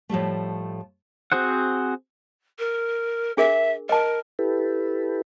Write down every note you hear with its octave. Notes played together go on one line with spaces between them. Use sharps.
A2 F3 G3 A3
C4 F#4 G#4 C5 F#5
A#4
D4 G#4 A#4 E5
A#4 D#5 A5
E4 G4 A4 B4